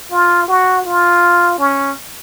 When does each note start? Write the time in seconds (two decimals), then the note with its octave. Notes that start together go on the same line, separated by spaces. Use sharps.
0.12 F4
0.48 F#4
0.85 F4
1.59 C#4